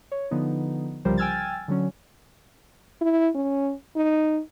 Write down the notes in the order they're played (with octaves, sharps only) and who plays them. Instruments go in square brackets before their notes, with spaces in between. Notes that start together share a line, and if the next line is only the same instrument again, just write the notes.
[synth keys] C#5
D3 F3 B3 D#4
C2 C#3 F3 G3 A#4 C5
G5 G#5 E6 F6 G#6 A6
D3 F#3 C#4
[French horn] E4
C#4
D#4